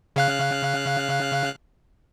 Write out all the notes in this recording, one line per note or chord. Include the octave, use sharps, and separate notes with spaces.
C#3 F5 F#6